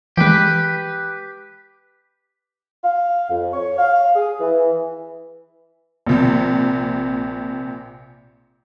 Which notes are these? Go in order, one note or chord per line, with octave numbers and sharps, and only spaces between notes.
E3 G#3 G4 B4
F5
F2
C#5
F5
G#4
E3
A#1 C3